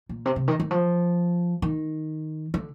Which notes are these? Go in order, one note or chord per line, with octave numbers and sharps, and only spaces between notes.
A#2
C3
C3
D#3
D#3
F3
D#3
D3